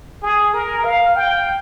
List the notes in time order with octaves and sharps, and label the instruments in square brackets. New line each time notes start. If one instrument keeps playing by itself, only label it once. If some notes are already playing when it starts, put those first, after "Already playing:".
[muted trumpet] G#4
A#4
F5
G5